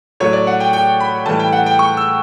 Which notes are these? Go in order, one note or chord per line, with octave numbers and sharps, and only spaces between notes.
A2 F#3 C#5
D5
F#5
G5
G5
B5
A2 E3 G3 A5
G5
F#5
G5
C#6
E6